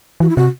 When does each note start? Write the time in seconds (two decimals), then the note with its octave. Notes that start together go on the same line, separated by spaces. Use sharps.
0.20 E3 F#4
0.29 E4
0.37 C3 F#4